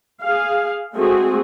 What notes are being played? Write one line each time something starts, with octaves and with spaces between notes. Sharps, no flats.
G#4 F5
G#3 A3 C4 F#4 G#4